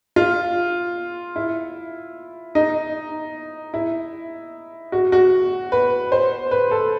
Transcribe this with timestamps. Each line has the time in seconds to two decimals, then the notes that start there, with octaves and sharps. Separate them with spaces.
0.16 F4
1.36 E4
2.55 D#4
3.74 E4
4.92 F#4
5.12 F#4
5.72 B4
6.12 C5
6.51 B4
6.71 A4